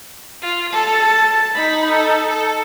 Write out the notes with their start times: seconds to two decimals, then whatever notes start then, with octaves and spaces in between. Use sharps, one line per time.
0.42 F4
0.73 A4 A5
1.55 D#4 B5
1.90 A4
2.30 A4